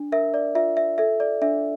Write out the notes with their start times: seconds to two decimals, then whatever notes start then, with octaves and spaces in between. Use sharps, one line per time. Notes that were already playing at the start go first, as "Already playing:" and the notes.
Already playing: D4
0.12 A#4 E5
0.34 D5
0.55 F4 E5
0.77 E5
0.98 A4 E5
1.20 D5
1.42 D4 E5